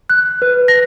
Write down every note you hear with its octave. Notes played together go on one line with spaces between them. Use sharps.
F#6
B4
A#6